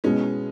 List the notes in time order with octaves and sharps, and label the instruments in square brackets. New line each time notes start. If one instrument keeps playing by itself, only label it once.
[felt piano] B2 B3 E4 [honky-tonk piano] G#3 C#4